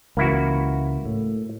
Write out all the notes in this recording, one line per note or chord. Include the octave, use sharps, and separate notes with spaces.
C#2 E3 A#3 E4 F#4
A2